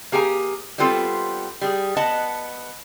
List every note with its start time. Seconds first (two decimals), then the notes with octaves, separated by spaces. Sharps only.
0.12 A#3 G4 G#4 F#5 A#5
0.78 G3 B3 C4 F4 A4
1.61 G3 G#4
1.97 B3 D#5 F#5 A5